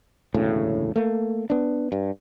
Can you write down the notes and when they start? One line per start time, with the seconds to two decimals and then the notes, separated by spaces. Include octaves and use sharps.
0.34 E1 D2 A2 C#3
0.96 A3 A#3
1.50 B3 D4
1.92 G2